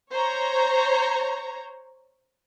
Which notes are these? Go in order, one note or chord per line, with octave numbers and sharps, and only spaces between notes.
C5 C#5 A#5